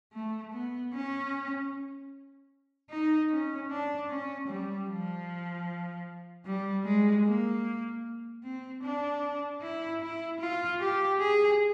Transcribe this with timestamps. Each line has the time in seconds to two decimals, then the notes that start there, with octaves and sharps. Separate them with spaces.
0.13 A3
0.53 B3
0.93 C#4
2.90 D#4
3.30 C#4
3.70 D4
4.09 C#4
4.48 G3
4.88 F3
6.46 G3
6.85 G#3
7.25 A#3
8.44 C4
8.83 D4
9.61 E4
10.01 E4
10.40 F4
10.80 G4
11.20 G#4